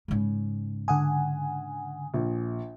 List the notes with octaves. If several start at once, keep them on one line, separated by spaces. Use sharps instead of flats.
G#2 C#3
D3 F#5 G#5 D#6
A#1